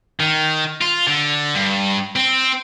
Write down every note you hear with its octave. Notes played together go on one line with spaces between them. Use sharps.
D#3
F4
D3
G2
C4